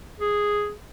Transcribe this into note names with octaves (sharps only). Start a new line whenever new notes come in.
G#4